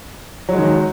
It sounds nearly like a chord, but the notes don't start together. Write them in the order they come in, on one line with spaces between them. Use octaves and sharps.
F#3 G#3 D#3